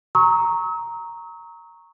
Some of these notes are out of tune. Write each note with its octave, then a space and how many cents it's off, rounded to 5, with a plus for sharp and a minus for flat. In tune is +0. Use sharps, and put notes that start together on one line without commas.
A#5 +0 C#6 -10 E6 -45